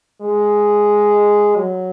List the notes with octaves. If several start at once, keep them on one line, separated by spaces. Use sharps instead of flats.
G#3
F#3